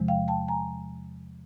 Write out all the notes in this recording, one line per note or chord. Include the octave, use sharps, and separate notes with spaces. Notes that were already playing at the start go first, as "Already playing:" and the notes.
Already playing: E2 C3 F3 G#3
F5 G5
G5 A5
G#5 A#5